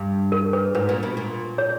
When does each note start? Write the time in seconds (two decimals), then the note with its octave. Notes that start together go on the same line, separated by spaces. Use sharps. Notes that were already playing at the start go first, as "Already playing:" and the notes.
Already playing: G2
0.32 A#4
0.53 B4
0.75 G#2 B4
0.89 A#2
1.03 B2
1.17 A#2
1.58 C#5